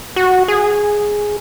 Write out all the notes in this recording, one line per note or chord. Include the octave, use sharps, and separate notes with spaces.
F#4
G#4